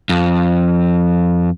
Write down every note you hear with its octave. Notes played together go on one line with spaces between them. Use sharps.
F2